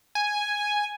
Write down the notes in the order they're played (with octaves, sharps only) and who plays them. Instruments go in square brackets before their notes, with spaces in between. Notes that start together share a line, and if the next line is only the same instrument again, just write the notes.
[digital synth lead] G#5